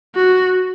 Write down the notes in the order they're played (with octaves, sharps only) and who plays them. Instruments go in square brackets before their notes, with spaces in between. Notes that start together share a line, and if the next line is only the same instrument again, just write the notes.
[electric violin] F#4